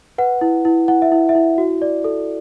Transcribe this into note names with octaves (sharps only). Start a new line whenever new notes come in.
B4 F#5
E4
E4
E4 F#5
E5
E4
E5
E4
F#4
D5
A4